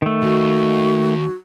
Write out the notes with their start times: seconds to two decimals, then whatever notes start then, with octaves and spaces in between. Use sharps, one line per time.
0.02 D#3 A3
0.22 D#2 F#4